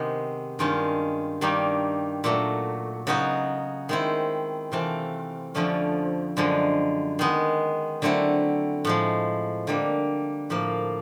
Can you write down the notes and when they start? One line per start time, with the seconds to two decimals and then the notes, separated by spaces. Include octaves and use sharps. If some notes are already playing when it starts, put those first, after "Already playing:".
Already playing: C3 D#3 G#3 B3
0.59 G2 D#3 G#3 C#4 F4
1.41 G2 D#3 G3 A#3 D#4
2.24 A#2 F#3 A3
3.07 C#3 F#3 B3 D#4 F#4
3.89 D#3 G#3 C4 E4
4.72 C3 E3 A3 C4 F4
5.55 F2 D3 F3 A3 C#4
6.37 F#2 D3 F3 G#3
7.19 D#3 G#3 B3
8.02 D3 F#3 A3 C4 E4
8.85 A2 F3 G#3
9.67 D3 G3 A#3
10.50 A2 F3 A#3